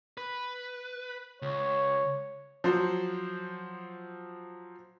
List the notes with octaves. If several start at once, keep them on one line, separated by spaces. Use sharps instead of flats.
B4
C#2 C#5
F3 F#3 C5